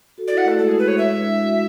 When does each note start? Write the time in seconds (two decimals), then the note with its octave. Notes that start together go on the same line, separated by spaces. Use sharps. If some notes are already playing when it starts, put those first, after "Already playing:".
0.18 F#4 A4
0.28 E4 G#4 D5
0.38 F#5
0.45 A3 A4
0.58 G#3 A4
0.68 G#4
0.79 B4
0.88 C#5
0.98 G#3 E5
1.08 E4
1.18 D4
1.28 E4
1.39 D4 F#4